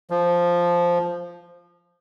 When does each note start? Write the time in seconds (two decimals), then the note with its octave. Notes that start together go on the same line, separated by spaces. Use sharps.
0.10 F3